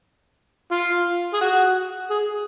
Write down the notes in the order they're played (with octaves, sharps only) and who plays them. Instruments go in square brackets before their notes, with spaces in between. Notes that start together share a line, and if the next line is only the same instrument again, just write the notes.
[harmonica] F4
G#4
F#4
G#4